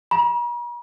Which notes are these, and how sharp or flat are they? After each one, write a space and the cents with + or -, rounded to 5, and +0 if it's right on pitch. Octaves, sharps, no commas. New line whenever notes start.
A#5 +45